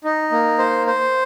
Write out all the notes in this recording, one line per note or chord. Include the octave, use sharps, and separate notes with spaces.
D#4
A#3
C5
C5